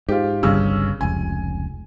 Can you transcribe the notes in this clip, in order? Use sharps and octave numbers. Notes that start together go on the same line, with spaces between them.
G#2 F4 G4
G1 C2 G2 C#3 C#4 E6
F1 C#2 G#5